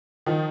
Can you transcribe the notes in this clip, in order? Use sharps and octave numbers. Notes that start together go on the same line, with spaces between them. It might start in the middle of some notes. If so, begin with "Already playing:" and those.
D#3 F3